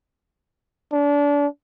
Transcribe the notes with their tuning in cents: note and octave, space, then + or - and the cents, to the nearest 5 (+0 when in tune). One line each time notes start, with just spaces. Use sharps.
D4 -30